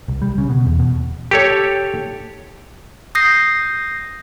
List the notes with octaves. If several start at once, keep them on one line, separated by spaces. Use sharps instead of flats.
C2
G3
C#3
B2
E2
B2
G4 A4 C#5
D#6 G6 A#6 C7